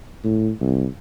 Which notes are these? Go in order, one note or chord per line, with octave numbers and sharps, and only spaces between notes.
A2
C2